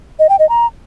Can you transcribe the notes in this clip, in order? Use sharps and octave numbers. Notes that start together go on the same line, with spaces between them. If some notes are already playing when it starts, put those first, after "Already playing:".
D#5
G5
D#5
A#5